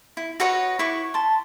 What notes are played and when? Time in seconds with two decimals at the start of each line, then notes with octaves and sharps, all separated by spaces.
0.17 E4
0.40 F#4 B4 C#5 D#5
0.79 E4 B4 C#6 D6
1.14 A5 C6